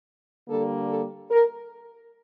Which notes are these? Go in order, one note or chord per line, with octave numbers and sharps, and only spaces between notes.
D3 G3 A#3 A4
A4
A#4